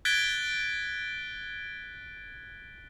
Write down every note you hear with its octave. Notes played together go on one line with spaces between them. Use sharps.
F#6 G#6 A6 B6 D7 G7